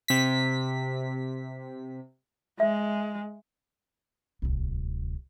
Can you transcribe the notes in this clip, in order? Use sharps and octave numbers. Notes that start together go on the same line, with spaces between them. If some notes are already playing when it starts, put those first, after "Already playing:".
C3 B6
G#3 E5
D1 C2